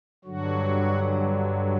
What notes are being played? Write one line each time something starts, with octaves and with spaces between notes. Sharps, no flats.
G2 D3 F#3 F#4